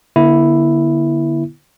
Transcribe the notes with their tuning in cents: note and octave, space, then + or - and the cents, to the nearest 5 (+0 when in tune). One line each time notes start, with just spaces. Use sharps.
D3 +0 B3 -45 E4 +0